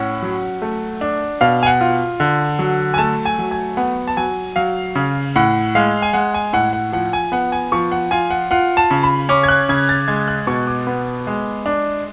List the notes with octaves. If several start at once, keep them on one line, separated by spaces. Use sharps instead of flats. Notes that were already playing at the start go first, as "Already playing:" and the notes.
Already playing: A2 C#4 F#5
F#3
A3
D4
B2 F5
G#5
F#5
F4
D3
F#3
G#5
A3 A5
G#5
F#3
G#5
B3 F#5
A5
F#3 G#5
F#3 F5
C#3
A2 F#5
G#3 F5
G#5
G#3 F#5
G#5
A2 F#5
F#5
F3 F#5
G#5
B3 F#5
G#5
F3 C#6
F#5
F4 G#5
F#5
F4 F#5
A5
C#3
B5
C#4 D6
G#6
F#6
C#3 G#6
A6
G#3 G#6
F#6
B2 C#6
D6
B3
G#3
D4